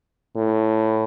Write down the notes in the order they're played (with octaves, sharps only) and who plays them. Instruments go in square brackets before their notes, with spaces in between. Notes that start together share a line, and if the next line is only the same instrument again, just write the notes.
[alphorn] A2